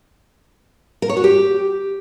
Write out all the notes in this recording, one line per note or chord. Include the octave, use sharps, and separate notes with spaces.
A#4
C#5
F#4
G4